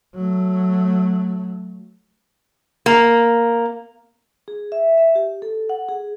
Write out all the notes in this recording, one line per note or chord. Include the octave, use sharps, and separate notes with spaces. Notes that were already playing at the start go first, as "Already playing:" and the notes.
F#3 A3
A#3
G#4
E5
E5
G4
A4
F#5
G#4